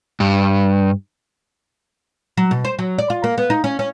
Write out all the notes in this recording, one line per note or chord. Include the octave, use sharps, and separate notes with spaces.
G2
F#3
B2
C5
F#3
D5
F4
A#3
B3
D#4
C#4
C#4